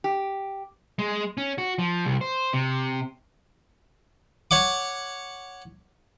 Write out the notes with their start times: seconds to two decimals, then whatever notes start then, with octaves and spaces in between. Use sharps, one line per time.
0.04 G4
0.99 G#3
1.38 C#4
1.58 F#4
1.78 F3
2.05 C2
2.21 C5
2.53 C3
4.51 C#5 F#5 D6